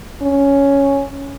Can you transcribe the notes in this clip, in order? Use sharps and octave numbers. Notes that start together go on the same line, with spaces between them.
C#4